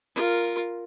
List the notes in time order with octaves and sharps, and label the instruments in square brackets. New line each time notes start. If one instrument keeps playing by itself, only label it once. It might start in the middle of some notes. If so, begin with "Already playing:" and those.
[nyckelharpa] F4 A#4